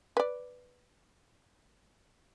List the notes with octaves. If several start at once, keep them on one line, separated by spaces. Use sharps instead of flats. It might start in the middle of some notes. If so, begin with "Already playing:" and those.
B4 D5